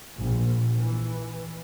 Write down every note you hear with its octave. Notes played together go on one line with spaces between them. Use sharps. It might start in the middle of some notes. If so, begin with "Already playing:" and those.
A#1
E3